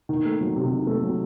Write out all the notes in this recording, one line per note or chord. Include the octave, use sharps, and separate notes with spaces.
D#3
A3
F#3
C3
D#3
A3
F#3